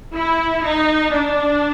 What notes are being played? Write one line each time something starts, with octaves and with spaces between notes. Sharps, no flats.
E4
D#4
D4